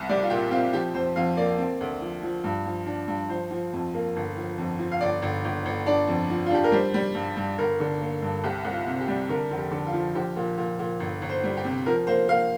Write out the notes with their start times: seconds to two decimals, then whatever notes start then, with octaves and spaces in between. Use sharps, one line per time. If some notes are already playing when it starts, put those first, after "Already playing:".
Already playing: C2
0.09 G3 D5
0.23 F4
0.30 A#2 G4
0.51 C4 F4
0.73 F3 G4
0.94 F2 C5
1.16 F2 F5
1.37 A#3 D5
1.58 C4
1.81 D2
2.01 F3
2.23 F3
2.44 G2
2.66 F3
2.86 D4
3.08 G2
3.29 F3 C5
3.51 F3
3.73 F2
3.94 A#3
4.16 G1
4.37 F3
4.58 F2
4.79 F3
4.92 F5
5.01 G1 D5
5.22 G1
5.45 G1
5.65 G1
5.86 D4 D5
6.08 F2
6.30 F3
6.46 F4
6.50 D4 G4
6.64 A#4
6.72 G3 C5
6.94 G3
7.15 G2
7.36 G2
7.58 G1 A#4
7.80 D3
8.01 A#3
8.22 G2
8.44 C2 G4
8.65 C2
8.72 F4
8.87 C3
9.00 G4
9.08 G3
9.29 D3 A#4
9.51 F1
9.58 G4
9.71 D3
9.87 F4
9.93 F3
10.15 A#1 G4
10.36 A#2
10.58 A#2
10.79 A#2
11.00 G1
11.22 G1
11.29 C5
11.44 G3
11.57 G4
11.65 C3
11.86 F3 A#4
12.07 A#3 C5
12.28 A#3 F5